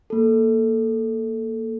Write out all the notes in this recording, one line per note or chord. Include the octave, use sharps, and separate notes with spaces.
A#3 A4